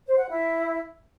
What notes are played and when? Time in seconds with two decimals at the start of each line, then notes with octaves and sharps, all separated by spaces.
0.06 C5
0.18 F#5
0.30 E4